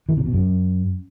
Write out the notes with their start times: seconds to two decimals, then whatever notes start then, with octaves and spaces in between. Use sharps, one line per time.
0.09 E3
0.17 C3
0.25 B2
0.34 F#2